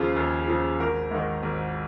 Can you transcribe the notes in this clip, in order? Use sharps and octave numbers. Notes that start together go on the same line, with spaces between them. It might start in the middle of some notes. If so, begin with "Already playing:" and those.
Already playing: D#2 C#3 F3 F4 G#4
D#2
C#3 F3
G#1 A#4
G#2 D#3
G#1